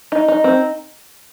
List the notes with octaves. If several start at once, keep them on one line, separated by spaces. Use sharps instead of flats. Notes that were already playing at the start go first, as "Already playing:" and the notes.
D#4
D#4
C4